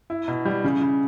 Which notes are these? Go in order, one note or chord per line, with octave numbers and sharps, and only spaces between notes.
E4
B2
G3
C#3
C#3